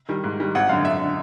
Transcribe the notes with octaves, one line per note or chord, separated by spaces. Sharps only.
D#3 G3
G#2
D#3 G3
G#1 F#5
F#2 D3 F5
G#1 E5
D3